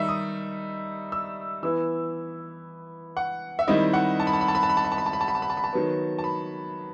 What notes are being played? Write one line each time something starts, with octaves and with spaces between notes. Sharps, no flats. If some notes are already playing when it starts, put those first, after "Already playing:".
Already playing: D#3 G3 D#4 E5
D#6
E6
E3 B3 E4 E6
F#5
E5
D#3 G3 C4 E4 D#5
F#5
A5
B5
A5
B5
A5
B5
A5
B5
A5
B5
A5
B5
A5
B5
A5
B5
A5
B5
A5
B5
A5
D#3 F#3 B3
A5
B5